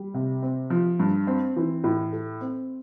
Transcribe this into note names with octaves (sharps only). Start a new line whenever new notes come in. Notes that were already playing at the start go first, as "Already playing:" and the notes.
Already playing: G3
C3
C4
F3
G2
C4
E3
A2
A4
C4